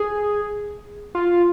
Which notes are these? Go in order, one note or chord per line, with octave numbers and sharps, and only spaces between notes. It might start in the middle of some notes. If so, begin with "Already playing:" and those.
Already playing: G#4
F4